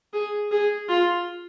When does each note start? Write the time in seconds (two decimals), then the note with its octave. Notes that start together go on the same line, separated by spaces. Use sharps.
0.13 G#4
0.51 G#4
0.89 F4